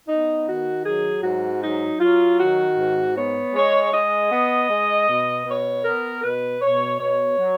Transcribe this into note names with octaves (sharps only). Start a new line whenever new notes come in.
B3 D#4
D#3 F#4
F#3 G#4
G#2 F#4
F#3 D#4
F#3 F4
D#3 F#4
G#2
B3 C#5
G#3 C#5
G#3 D#5
B3
G#3
B2
B2 C#5
B3 A#4
B2 B4
B2 C#5
B2 C#5
F#3